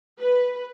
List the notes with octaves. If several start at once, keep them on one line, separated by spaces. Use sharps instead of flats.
B4